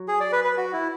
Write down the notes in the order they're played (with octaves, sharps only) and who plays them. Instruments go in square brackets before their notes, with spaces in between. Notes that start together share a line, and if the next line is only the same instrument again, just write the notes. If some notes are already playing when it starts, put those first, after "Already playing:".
Already playing: [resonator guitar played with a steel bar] F#3
[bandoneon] G#4
D5
B4
B4
F#4
E4